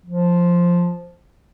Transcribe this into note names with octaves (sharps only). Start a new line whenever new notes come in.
F3